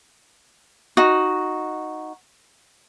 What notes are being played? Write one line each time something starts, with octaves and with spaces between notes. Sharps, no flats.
D#4 F#4